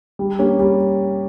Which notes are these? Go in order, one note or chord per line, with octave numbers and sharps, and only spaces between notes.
G3
A#3 C#4 G4
G3